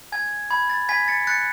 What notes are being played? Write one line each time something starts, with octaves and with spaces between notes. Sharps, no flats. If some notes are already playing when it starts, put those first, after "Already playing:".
G#5 G#6
B5 G#6
A6
G#5 G#6 B6
A6 C#7
F#6 A6 C#7